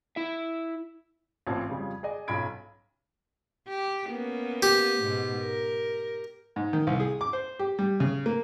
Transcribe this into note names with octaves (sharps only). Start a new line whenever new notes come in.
E4 E5
A1 A#2 C4 A5 G#6
F2 C#3 F3 G3 G#3
G#4 D5 D#5 G#5
B1 F#2 F4 B5 G#6 D7
G4
A#3 B3 C#4
G4
G#2 B2
A#4
G#2
D#3
C2
G#4
D6
C5
G4
G3
C#3
A#3